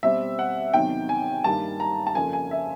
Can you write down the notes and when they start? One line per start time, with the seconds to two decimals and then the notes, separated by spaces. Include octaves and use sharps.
0.03 B2 G3 C4 E5
0.39 F#5
0.74 E2 C3 D#3 F#3 G5
1.09 G#5
1.44 G2 D#3 G3 A#3 A5
1.80 A#5
2.07 A5
2.15 F2 C#3 F3 A#3 G#5
2.33 G#5
2.51 E5